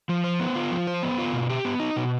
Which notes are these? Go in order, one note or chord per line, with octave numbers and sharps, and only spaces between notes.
F3
C5
B3
F4
F3
C5
B3
F4
B2
G4
B3
D#4
B2